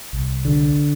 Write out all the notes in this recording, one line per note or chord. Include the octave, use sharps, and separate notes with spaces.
C2
D3